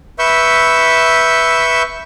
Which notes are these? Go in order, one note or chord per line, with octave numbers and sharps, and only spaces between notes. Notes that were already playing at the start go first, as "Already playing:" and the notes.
B4 E5 C#6 E6 G6